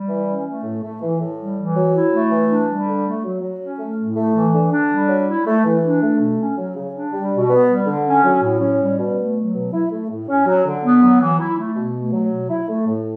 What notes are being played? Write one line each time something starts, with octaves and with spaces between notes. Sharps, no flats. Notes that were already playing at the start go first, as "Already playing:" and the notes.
Already playing: G3
E3
C#4
A3
A2
A3
E3
A2
G3
E3
F#3
E4
A3
E3
D4
G3
D3
A3
F#3
F#3
C#4
A3
A2
A3
E3
D3
D4
G3
F#3
E4
A3
E3
D4
A3
B2
C#4
F#3
C#3
D4
G3
B2
B3
G3
D3
C#4
F#3
A2
C#4
G3
B2
A3
F#3
B2
E4
A3
A2
C#4
F#3
D3
B3
F#3
E3
E4
A3
B2
A3
F#3
B2
E4
A3
A2